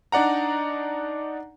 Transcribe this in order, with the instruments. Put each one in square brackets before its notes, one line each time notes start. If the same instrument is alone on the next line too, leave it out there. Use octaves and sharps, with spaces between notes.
[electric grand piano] D4 D#4 D5 F#5 A#5